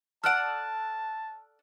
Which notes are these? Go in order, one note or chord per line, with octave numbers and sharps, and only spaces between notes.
A4 D5 F#5 A5 F6 F#6 D7